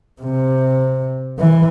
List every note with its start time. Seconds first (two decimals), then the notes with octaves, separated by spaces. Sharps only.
0.22 C3
1.39 E3